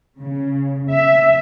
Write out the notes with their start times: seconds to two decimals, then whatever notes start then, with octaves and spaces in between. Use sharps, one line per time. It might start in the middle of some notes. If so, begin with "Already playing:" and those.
0.19 C#3
0.94 E5